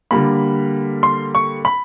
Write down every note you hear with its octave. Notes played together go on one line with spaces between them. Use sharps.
D3 G3 A#3 B5
C6
C#6
B5